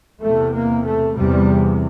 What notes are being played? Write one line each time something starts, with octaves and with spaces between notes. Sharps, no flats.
E2 C3 A3
A#3
A3
E2 C3 G3